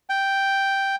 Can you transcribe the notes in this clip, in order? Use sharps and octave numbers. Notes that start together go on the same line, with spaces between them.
G5